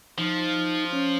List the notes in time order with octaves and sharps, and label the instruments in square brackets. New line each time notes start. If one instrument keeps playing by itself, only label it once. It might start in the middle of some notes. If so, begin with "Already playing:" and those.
[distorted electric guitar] F3 [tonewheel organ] D#4
[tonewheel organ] C#4